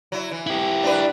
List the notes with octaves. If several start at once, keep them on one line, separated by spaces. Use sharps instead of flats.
F#3 E4
E3
E4 G4
D4 B4